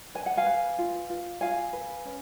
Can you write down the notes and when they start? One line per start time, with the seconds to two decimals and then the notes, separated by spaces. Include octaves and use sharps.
0.15 B4 G#5
0.26 F#5
0.37 F5 G#5
0.46 B4
0.78 F4
1.10 F4
1.41 F4 F5 G#5
1.73 B4
2.05 C#4